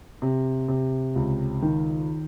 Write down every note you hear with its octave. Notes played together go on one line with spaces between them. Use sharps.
C3
C3
C#2
D#3